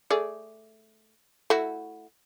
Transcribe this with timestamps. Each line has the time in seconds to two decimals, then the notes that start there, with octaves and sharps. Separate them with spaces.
0.10 A3 G#4 D5
1.50 A3 E4 F#4